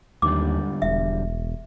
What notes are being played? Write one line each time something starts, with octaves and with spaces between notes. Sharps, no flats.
D#2 G#2 D3 G3 D6
E1 E5